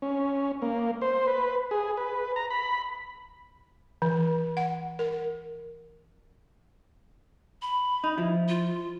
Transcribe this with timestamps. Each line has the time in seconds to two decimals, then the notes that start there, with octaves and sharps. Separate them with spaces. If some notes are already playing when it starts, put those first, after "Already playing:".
0.02 C#4
0.62 A#3
1.02 C5
1.27 B4
1.71 G#4
1.97 B4
2.36 A#5
2.50 B5
4.02 E3
4.57 F#5
4.99 A#4
7.62 B5
8.04 D#4
8.17 F3 E4
8.48 F4